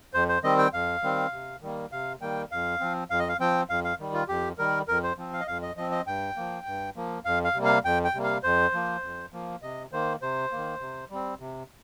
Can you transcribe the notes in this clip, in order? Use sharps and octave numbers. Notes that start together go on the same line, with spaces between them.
F2 C5
C5
D#3 G3 C4 D#5
G5
F2 F5
D#3 G3 C4
C3
D#3 G3 A#3
C3 F5
D#3 G3 A#3 G5
F2 F5
F3 C4
F2 F5
D#5
F5
F3 C4 G5
F2 F5
F5
D#3 G3
F4
F2 G4
D#3 G3 A#4
F2 A#4
C5
F3 C4
F5
D#5
F2 F5
D#5
F3 C4 D#5
D#5
G2 G5
F3 A#3
G2
F3 A#3
F2 F5
F5
C3 G3 A#3
F5
F2 G5
G5
C3 G3 A#3
F5
F2 C5
F3 A#3
F2
F3 A#3
C3 D#5
D#3 A#3 C5
C3 C5
D#3 A#3
C3
G3 C4
C3